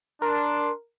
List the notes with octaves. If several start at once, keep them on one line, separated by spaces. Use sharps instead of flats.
D4 A#4 C6